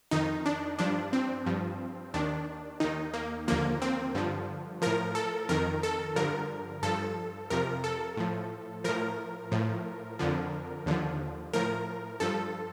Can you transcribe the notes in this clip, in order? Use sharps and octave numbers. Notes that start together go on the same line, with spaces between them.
F2 D#3 D#4
D4
G2 F3 D4
C4
G2 F3
D#2 D#3 D4
D#2 D#3 D#4
A#3
D#2 D3 F3 A#3
C4
G2 D3 F3
A2 F3 A#4
A4
F2 D#3 A#4
A4
G2 D3 F3 A#4
G2 F3 A4
F2 C3 F3 A#4
A4
A2 F3
A2 F3 A#4
A2 F3
F2 D3 F3
D#2 D3 F3
A2 F3 A#4
G2 F3 A4